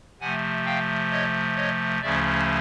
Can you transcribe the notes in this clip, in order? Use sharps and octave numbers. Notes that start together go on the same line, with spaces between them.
C3 F3 A3 F#5 G#5
F5 G5
C#5 D#5
C#5 D#5
D2 C#3 F3 A3 C#4 D5 E5